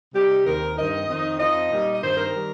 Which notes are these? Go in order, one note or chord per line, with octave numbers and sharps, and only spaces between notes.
C3 G3 D#4 G4
D#2 D#3 C4 D#4 A#4
G2 D#3 C4 D#4 D#5
F2 D#3 C4 D#4
F2 F3 D#4 D#5
A#2 G3 D#4
D#5
G2 D#3 C4 D#4 C5
A#4
D#3 G3